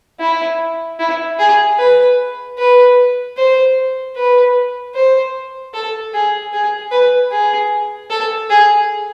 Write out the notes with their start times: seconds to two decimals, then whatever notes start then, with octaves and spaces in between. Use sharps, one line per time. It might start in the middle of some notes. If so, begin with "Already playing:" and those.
0.20 E4
0.99 E4
1.39 G#4
1.79 B4
2.59 B4
3.37 C5
4.16 B4
4.95 C5
5.74 A4
6.14 G#4
6.53 G#4
6.92 B4
7.32 G#4
8.10 A4
8.50 G#4